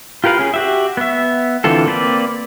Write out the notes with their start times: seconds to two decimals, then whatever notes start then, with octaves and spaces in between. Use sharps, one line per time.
0.24 F4 G4 A#4 B4 F5
0.39 C#4 G#4
0.54 F#4 G4 E5
0.97 B3 E5
1.64 D3 E3 C4 F4 A4
1.86 A#3 C4 B4 D5